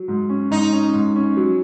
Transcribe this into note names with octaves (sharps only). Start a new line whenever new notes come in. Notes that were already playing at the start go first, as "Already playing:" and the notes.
Already playing: F#3
G#2
C#4
G#2 D#4
C#4
G#2
C#4
F#3